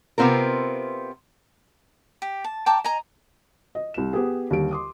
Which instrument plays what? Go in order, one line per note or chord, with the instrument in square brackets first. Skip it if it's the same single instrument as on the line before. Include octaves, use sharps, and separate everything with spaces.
[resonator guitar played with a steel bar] C3 B3 C4 F4 A#4
[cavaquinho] G4
A5
G5 A5 A#5 D6
D#5 G#5 A#5
[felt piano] D#5
C2 E7
B3 G4 G#4
D#2 D3 G3 D7
C6 D6 D#6